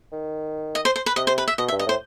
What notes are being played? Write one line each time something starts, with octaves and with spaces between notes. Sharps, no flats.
D#3
D#5
C5
C5
B4
C3 D#5
C5
B4
E5
B2 D#5
E5
G2
D#5
A2 C5